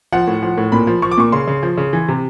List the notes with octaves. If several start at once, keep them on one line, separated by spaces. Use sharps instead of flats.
F3 F#5
A2
F3
A2
A#2 B5
F3
F3 C#6
D6
A#2 C#6
C#3 C6
C#3
F3
C#3
E3
C3